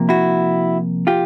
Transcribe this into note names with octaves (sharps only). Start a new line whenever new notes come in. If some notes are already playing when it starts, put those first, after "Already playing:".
Already playing: C3 F3 A#3
E4 F#4
F4 G4